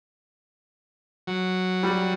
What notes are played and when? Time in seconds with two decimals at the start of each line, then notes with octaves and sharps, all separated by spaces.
1.27 F#3
1.83 G3